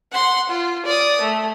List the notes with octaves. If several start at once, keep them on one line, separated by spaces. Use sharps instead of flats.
F#5 C6
F4
D5 D#6
A3